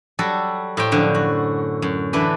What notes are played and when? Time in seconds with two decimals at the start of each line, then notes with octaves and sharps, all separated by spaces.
0.19 F#3 G3 F#4 A4
0.77 A2 C5 G5 C6
0.92 F#2 D3 F3
1.15 F#4
1.82 F#2
2.13 D3 E3 D4 B4